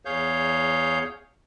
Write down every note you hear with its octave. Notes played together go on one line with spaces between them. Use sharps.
E2 G#4 C#5 F5 G6